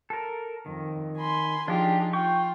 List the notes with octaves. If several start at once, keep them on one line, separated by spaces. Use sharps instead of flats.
A4 A#4
F2 D#3
G#5 B5 C6
F3 D4 D#4 F4 G4 G#4
F4 G5 C#6